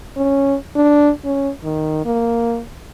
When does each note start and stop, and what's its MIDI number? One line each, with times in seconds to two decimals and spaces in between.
0.17 0.55 61
0.76 1.10 62
1.25 1.50 61
1.64 2.02 51
2.05 2.60 58